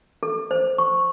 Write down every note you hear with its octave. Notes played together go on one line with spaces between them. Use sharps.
A4
C5
C#6